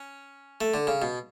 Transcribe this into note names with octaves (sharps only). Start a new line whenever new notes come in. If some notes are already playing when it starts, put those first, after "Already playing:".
Already playing: C#4
A3
D3
C#3
B2